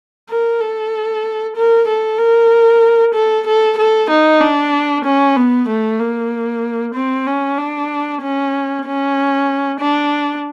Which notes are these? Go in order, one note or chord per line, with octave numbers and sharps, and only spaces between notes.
A#4
A4
A#4
A4
A#4
A4
A4
A4
D#4
D4
C#4
B3
A3
A#3
C4
C#4
D4
C#4
C#4
D4